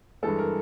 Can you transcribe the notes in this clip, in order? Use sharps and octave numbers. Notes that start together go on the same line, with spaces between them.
G2 E3 G#3 A4
A#4